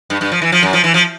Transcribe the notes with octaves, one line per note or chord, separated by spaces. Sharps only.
G2
G2
F3
E3
F3
F#2
F3
E3
F3